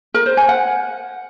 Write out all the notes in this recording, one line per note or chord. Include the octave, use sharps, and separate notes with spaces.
A#4
C5
G#5
F#5